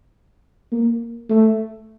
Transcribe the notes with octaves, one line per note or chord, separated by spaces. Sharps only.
A#3
A3